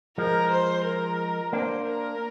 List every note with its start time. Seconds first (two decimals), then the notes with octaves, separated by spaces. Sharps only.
0.18 F3 G#3 A#4
0.51 C5
0.85 A#4
1.53 A#3 D4 C5
1.87 A#4